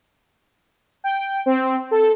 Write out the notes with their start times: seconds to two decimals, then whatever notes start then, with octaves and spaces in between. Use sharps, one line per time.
1.04 G5
1.46 C4
1.91 A4